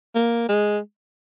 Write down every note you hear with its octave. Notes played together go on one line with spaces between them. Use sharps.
A#3
G#3